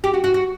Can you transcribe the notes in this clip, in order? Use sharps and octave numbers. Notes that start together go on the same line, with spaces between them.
G4
F#4
F#4
F#4